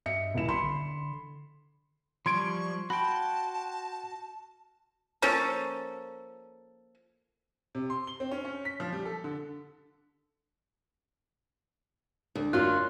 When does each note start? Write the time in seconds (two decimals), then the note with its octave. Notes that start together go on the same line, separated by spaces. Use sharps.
0.06 G2 D#5 E5 C#7
0.34 D#1 B2 E4 E7
0.49 B1 B5 C6 C#7
0.63 D3
2.26 F3 G3 C6 C#6 G#6 D7
2.90 F#4 G5 A5 B5
5.22 F3 A#3 C#4 A4
7.75 C3
7.90 C6
8.07 G7
8.20 C4
8.31 C#4
8.45 C#4
8.65 B6
8.80 F3
8.93 G3
9.05 A4
9.24 D3
12.35 D2
12.53 F#2 F#3 A#3 F4 C6 F#6